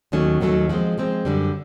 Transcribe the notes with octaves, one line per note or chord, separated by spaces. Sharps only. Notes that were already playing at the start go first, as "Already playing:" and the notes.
D#2 D#3 F#3 A3 C#4
D#2 D#3 F#3 A3 C#4
F3 G#3 C4
F3 G#3 C4
F#2 D3 G3